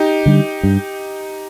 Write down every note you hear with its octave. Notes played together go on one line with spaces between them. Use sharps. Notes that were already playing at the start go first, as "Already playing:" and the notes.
Already playing: D#4 G4
D3 G3
G2